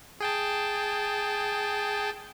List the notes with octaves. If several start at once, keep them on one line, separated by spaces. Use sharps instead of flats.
G#4 G5 A5